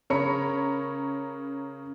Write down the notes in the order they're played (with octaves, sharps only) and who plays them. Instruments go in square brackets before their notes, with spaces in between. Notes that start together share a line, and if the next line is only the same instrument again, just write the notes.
[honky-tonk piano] C#3 A#4 C#5 B5 C#7